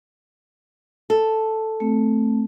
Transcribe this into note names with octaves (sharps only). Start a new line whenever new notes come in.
A4
A3 C4